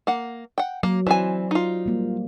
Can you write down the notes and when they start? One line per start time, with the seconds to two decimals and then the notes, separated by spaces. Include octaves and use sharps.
0.07 A#3 F#5
0.58 F#5 G5
0.83 F#3 A#3
1.07 E3 C4 C5 D5 G#5
1.51 D#4 F4
1.86 G3 A#3